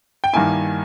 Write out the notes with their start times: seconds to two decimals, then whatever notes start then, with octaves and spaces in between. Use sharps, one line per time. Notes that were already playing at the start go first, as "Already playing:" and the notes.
0.24 G5
0.33 G2 D#3 A#3 E4 G#5